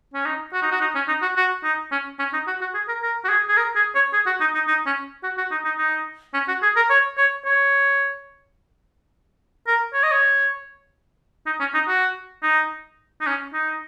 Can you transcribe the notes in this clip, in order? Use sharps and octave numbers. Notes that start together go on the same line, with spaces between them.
C#4
D#4
F#4
D#4
F#4
D#4
C#4
D#4
F#4
F#4
D#4
C#4
C#4
D#4
F#4
F#4
G#4
A#4
A#4
F#4
G#4
G#4
A#4
G#4
C#5
G#4
F#4
D#4
D#4
D#4
C#4
F#4
F#4
D#4
D#4
D#4
C#4
F#4
G#4
A#4
C#5
C#5
C#5
A#4
C#5
D#5
C#5
D#4
C#4
D#4
F#4
D#4
D#4
C#4
D#4